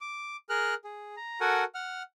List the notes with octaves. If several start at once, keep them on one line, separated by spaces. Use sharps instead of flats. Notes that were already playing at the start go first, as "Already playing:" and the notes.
D6
G#4 A#4 F6 F#6
G#4
A#5
F#4 A4 A#4 F#5 G#5
F#5 F6